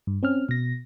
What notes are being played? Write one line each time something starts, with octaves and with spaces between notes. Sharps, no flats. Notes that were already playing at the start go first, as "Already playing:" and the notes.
G2
C4 C#4 F6
B2 A#6